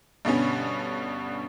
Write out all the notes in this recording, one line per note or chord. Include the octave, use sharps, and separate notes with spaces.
G2 B2 D3 B3 C#4